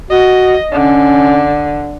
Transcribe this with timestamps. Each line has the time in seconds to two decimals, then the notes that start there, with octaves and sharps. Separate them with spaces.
0.11 F#4 D#5
0.72 D3 C#4